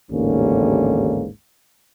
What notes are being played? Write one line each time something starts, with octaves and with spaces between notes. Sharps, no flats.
A1 D#2 G#2 D3 A#3 C#4